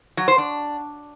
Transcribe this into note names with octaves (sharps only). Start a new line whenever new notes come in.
F#3
C5
D4